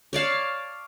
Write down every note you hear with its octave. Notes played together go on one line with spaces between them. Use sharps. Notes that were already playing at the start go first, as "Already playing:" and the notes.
C#5 D5 F5 A5